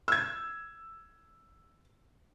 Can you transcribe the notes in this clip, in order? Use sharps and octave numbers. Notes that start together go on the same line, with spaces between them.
E6 G#6